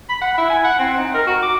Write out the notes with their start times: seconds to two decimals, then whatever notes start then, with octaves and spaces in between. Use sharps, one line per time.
0.09 B5
0.22 F#5
0.38 E4
0.50 G#5
0.64 F#5
0.79 C4
0.98 D#4
1.15 A#4
1.27 F#4
1.42 D6